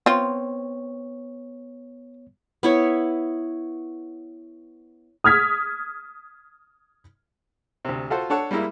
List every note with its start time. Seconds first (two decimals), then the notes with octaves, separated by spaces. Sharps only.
0.06 B3 C4 F4 C#5
2.63 B3 E4 C#5
5.24 D#6 F6 G#6 B6
7.85 D2 C3
8.10 F4 F#4 A4 C5
8.30 D4 A4 C#5 F#5 A5
8.51 G3 G#3 A#3 E4